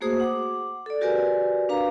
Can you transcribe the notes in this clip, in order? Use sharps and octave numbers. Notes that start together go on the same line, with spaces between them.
A3 A#3 F#4 G#4 C5 D#6
F#5 D6
A4 D5
F#4 G4 A#4 B4 D5 G#5
D4 B4 F5 A#5